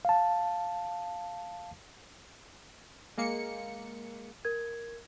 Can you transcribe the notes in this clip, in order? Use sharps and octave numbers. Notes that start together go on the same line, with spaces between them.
F5 A5
G#3 A#3 C#7
A#4 G#6